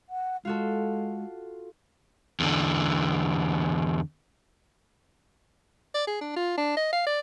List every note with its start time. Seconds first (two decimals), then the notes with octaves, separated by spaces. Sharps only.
0.09 F#5
0.45 G#3 F4 F#4 A4
2.40 E2 D3
5.95 D5
6.07 G#4
6.21 D4
6.36 F4
6.57 D4
6.77 D#5
6.92 F5
7.06 D5